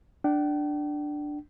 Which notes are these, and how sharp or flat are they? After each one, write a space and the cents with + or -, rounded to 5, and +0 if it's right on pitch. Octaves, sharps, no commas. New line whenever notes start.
D4 +5 G5 -40